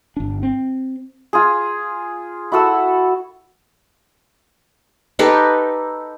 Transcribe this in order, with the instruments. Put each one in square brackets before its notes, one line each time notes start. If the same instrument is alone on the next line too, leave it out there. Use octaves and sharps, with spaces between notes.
[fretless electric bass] G1 D4
C4
[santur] F4 G#4
E4 F#4 A4 E6
[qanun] D#4 G4 A4 B4